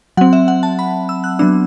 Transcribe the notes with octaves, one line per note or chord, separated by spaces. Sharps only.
F#3 C4 F#5
E5
F#5
A5
B5
E6
F#6
F#3 B3 D4 E6